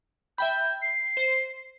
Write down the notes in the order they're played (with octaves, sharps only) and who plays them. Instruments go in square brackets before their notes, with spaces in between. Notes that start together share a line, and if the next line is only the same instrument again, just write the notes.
[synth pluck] E5 G5 B5 [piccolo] G6
[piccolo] C7
[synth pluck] C5